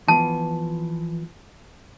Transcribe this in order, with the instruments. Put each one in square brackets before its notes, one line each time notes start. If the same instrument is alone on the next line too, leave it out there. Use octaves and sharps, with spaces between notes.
[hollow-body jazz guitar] E3 F3 B3 [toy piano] A5